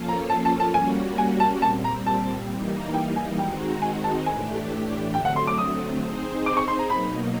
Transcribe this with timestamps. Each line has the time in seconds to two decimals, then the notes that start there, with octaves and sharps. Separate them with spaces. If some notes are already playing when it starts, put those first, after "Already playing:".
Already playing: F3 A#3 C#4 F4 A4
0.08 A#5
0.30 A5
0.45 A5
0.60 A5
0.74 G3 A#3 C#4 F#4 G#5
1.18 G#5
1.40 A5
1.62 A#2 G3 C4 A5
1.84 A#5
2.07 A5
2.50 E3 G3 A#3 D#4
2.94 G5
3.16 G#5
3.38 D#3 G#3 C4 D#4 F#4 G5
3.82 G#5
4.04 A5
4.26 A2 E3 A3 D4 G4 G#5
5.14 D3 F#3 A3 C4 G5
5.25 F#5
5.36 C6
5.47 D6
5.58 D#6
6.02 C4 D#4 G#4 C5
6.46 D6
6.57 C#6
6.68 C6
6.79 A#5
6.90 B2 F#3 A#3 D#4 B5